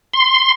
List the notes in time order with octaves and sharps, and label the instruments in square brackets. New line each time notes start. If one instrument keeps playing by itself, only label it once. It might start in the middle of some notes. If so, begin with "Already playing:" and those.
[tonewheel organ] C6